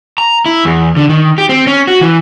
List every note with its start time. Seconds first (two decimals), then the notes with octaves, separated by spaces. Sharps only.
0.18 A#5
0.46 E4
0.65 E2
0.97 D3
1.09 D#3
1.38 G4
1.49 C4
1.67 C#4
1.88 F#4
2.01 E3